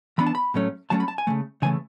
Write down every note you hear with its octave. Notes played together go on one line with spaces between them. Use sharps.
E3 B3 D4 B5
A5
B5
A2 F#3 A3 C#4
A2 F#3 A3 C#4 A5
B5
A5
G#5
C#3 E3 A3
C#3 E3 A3 G#5